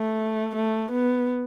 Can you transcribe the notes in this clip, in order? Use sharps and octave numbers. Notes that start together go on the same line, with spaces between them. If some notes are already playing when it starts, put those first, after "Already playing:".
Already playing: A3
A3
B3